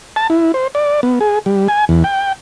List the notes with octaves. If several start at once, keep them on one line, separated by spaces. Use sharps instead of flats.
A5
E4
C5
D5
B3
G#4
G3
G#5
E2
G5